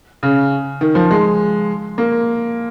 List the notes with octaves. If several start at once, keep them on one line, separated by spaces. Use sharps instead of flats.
C#3
D#3
F3
G#3
A#3